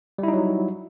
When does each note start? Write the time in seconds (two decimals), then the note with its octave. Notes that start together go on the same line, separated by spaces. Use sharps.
0.18 G3
0.23 E4
0.28 D#4
0.33 F#3